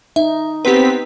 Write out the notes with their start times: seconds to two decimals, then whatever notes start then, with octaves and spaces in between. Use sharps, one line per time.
0.16 D#4 E5
0.65 B3 C4 G4 B4 B6